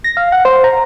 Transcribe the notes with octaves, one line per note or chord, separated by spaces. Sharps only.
A#6
F5
F#5
C5
A#5